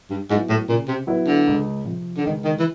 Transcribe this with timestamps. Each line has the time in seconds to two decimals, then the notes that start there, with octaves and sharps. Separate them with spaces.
0.10 G2
0.29 G#2 F#3 B3 E4
0.49 A2
0.68 A#2 C#3
0.88 C3
1.07 F#3 B3 E4
1.27 D3
1.47 C#2
1.85 C3 F3
2.17 D3
2.25 C#2 D#3
2.44 D#3
2.59 E3